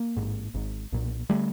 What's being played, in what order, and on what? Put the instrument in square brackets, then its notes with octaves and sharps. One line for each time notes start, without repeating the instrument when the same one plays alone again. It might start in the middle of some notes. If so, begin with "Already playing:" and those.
Already playing: [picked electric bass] A#3
A1 G#2
G#1 G#2
B1 A#2
D3 G3 A3